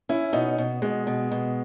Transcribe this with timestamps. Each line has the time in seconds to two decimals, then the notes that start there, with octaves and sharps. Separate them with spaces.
0.09 C#4 E4
0.33 B2 D#4
0.58 B2
0.82 B2 G#3
1.07 B2
1.31 B2